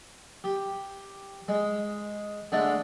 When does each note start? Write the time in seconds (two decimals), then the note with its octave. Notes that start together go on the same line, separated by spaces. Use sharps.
0.44 G4
1.48 G#3
2.52 D3 G#3 A3 D4